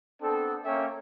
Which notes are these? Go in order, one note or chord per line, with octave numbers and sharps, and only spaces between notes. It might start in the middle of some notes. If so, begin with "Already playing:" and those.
B3 C4 D4 A4
A#3 C#4 A4 C#5 E5 G5